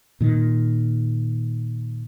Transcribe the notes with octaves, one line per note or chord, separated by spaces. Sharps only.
A#2 D#3